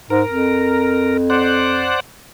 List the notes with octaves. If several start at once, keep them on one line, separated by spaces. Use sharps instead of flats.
G#2 A#4
F2
C5 D5 F#5